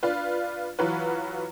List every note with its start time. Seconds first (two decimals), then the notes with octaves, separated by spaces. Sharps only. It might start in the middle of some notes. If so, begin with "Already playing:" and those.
0.03 D4 F4 B4
0.79 E3 F#3 F4 F#4 B4